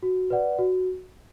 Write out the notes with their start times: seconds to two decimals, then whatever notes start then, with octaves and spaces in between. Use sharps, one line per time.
0.03 F#4
0.30 B4 D5 F#5
0.58 F#4